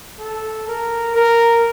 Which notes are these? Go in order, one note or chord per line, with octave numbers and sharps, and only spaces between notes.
A4
A#4
A#4